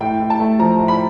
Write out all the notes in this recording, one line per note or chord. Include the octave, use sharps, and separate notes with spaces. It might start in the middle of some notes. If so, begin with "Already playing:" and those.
A2 G5
A2
A5
A3
F3 A#5
A2
B5